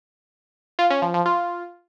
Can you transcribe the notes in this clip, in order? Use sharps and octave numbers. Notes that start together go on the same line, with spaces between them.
F4
C#4
F3
F3
F4